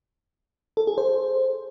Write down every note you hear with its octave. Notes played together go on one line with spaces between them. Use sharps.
A4
G#4
C5